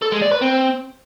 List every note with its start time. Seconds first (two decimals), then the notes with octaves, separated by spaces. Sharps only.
0.02 A4
0.12 G#3
0.22 D5
0.32 B4
0.41 C4